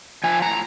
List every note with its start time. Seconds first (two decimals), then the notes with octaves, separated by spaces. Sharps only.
0.24 F3 G#5
0.42 A2 A#5